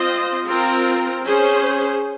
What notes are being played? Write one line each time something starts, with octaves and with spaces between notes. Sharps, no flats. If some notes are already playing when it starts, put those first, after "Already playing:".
Already playing: C4 F4 C5 D#5
C4 F4 A#4
C#4 G#4 C5